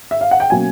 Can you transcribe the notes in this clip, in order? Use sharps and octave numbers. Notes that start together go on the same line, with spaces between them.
E5
F5
F#5
G5
B2 F#3 A#3 C#4 G#5